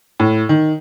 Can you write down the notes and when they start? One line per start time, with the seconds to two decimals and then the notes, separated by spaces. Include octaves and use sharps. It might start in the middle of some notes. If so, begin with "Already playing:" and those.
0.20 A2
0.49 D#3